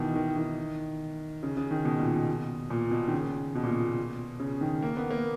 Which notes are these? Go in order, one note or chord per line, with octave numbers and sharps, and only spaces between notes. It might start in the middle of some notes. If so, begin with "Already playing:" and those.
Already playing: B2 D#3 E3
D#3
D#3
C#3
C#3
D#3
B2
A#2
B2
A#2
B2
D#3
C#3
B2
A#2
B2
C#3
D#3
A#3
B3
A#3